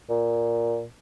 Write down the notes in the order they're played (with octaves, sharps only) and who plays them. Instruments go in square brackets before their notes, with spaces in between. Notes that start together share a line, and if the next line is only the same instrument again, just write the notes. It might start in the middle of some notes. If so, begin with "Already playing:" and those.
[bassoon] A#2